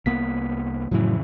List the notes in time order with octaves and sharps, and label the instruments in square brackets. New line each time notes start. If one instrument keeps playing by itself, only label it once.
[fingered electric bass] C2 A#3 B3 [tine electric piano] B6
[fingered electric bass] F2 C#3 E3 [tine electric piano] A2 F#3